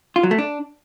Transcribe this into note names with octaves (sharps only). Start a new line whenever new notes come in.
F4
F#3
A3
D4